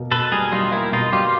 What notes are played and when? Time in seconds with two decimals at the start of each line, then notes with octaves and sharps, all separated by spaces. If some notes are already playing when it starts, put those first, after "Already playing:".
Already playing: B2 A#3
0.11 B2 A4 B4
0.32 G3 G#4 A#4
0.52 G3 D#4 F4
0.72 A#3 E4
0.92 B2 D#4 F4
1.13 G3 F4 G4